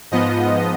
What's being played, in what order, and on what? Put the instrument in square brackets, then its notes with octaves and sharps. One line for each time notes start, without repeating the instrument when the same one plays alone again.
[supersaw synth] G#2 F3 B3 D#5